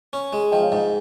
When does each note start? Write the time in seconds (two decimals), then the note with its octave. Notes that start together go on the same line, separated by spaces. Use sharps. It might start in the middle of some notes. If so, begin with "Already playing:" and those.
0.13 C#4
0.33 G#3
0.52 F3 D#5 G5
0.62 C#5 F5
0.72 G#2 D#5
0.82 D#5